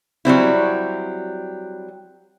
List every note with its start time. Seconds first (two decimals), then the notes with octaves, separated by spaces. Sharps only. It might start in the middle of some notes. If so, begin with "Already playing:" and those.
0.25 F#3 G3 C4 E4